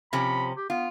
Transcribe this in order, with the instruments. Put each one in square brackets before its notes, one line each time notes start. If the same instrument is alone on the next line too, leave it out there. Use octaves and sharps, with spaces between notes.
[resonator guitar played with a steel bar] C3 F3 C#4 [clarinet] B5
[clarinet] G4
[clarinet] B3 [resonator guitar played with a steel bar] F4